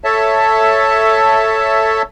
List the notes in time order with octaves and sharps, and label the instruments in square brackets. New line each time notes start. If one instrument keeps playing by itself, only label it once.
[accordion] A4 C#5 E5 A5